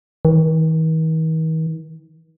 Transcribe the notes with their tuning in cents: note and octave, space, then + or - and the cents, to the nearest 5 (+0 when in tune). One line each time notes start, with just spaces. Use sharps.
D#3 +45